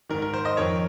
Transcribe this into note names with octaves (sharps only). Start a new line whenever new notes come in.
G#2 D#3 A#4
A#4
C5
C5 D#5
F2 D#3 A#4 C#5